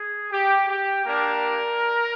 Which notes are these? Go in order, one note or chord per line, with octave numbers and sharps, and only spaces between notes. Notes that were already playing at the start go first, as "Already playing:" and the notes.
Already playing: G#4
G4
G4
A#3 D4 G4 A#4